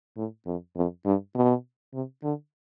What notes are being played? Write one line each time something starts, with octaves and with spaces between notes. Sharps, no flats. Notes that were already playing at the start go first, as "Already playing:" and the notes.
A2
F2
F2
G2
B2
C3
D3